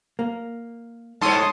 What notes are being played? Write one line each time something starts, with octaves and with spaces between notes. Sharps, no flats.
A#3
G2 C#5 A5 C6 D#6